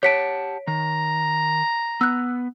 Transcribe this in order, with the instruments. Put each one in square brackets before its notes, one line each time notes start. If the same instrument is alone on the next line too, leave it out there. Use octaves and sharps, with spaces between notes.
[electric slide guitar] G4 F#5 A5 [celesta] C#5 B6 D7
[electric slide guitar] D#3 [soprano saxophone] A#5
[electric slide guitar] B3 [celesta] E6 F#6